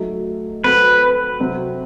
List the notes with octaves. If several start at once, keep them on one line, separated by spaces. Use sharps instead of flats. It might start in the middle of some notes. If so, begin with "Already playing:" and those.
Already playing: F#3 A3 D#4 F#4 A4
F#3 C4 F#4 A4 B4
C3 F#3 C4 F#4